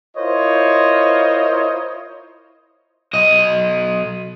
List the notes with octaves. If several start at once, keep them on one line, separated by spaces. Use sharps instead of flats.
E4 F4 A#4 C5 C#5 D#5
B1 D#5